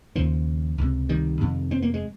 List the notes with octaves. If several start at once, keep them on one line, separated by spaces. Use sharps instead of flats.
D#2 C#3 F3
C#2 C3
D#3 G3
F2 C3
C4
A#3
G#3